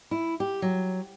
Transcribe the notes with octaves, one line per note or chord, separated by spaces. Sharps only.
E4
G4
F#3